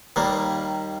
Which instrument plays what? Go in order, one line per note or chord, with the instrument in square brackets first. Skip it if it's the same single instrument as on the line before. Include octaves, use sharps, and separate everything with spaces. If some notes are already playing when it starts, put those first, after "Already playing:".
[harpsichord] D#2 D#3 G3 A#3